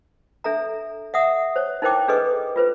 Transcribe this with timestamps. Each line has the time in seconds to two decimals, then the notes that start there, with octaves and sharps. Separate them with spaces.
0.44 D4 A4 E5 A#5
1.14 E5 F#5 D#6
1.56 C5 C#5
1.82 D#4 E4 A#4 C5 G5 D6
2.08 D4 G#4 A4 B4 D#5 C#6
2.56 F4 B4 C5